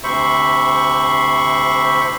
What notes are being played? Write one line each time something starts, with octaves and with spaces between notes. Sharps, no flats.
D2 C3 C5 E5 B5 C#6